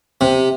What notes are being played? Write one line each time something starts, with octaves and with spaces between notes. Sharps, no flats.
C3